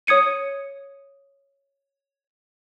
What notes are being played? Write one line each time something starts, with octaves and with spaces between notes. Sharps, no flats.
C#5 D#6 G#6 C#7 D#7